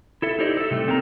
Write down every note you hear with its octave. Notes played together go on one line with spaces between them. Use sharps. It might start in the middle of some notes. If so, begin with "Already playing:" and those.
E4 A4 E5
D#4 E4 G4 C5 D5 D#5
A4 E5
C3 G3 A3
A#3 C4 A4 A#4 G5 A#5